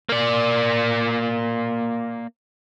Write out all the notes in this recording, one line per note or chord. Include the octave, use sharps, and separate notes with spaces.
A#3 D5